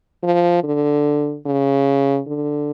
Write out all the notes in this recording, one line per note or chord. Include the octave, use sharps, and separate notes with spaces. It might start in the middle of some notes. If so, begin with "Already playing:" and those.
F3
D3
C#3
D3